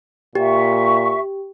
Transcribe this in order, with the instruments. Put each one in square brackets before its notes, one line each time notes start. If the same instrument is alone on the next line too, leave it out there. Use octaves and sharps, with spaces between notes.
[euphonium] A#2 [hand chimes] G4 [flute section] E5 C#6